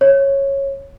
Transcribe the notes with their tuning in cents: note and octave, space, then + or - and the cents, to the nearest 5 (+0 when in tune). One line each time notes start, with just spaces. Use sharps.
C#5 -10